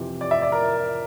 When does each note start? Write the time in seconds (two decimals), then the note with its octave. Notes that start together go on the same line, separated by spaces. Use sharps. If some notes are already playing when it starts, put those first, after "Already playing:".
Already playing: F2 C3 E3
0.21 D5
0.31 E5
0.42 D5
0.52 A#4